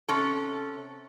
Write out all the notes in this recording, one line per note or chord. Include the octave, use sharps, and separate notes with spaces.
C3 C#4 A4